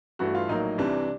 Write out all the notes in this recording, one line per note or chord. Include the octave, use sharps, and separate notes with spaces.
G2 E3 A3 F#4
F4
A#1 A2 F#3 A#3 D#4
C2 C3 E3 G3 D4